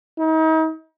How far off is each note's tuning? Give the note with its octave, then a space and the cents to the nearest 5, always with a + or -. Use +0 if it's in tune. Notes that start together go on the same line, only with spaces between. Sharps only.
D#4 +40